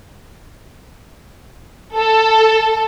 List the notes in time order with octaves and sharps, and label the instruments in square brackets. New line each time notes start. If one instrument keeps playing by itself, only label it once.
[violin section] A4